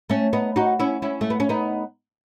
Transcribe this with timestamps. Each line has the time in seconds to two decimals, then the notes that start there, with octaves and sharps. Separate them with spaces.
0.09 A3 C#4
0.33 B3 D#4
0.56 D#4 F#4
0.79 C#4 E4
1.02 C#4 E4
1.21 A3
1.30 B3
1.40 C#4
1.49 B3 D#4